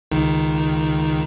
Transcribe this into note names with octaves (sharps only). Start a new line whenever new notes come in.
C#2 D#3